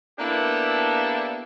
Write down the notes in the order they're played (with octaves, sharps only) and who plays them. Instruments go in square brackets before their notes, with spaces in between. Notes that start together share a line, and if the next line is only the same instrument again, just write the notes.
[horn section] A#3 B3 D4 E4 G4 A4